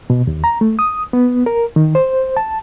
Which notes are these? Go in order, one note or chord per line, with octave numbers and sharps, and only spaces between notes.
B2
D#2
A#5
A3
D#6
B3
A#4
D#3
C5
A5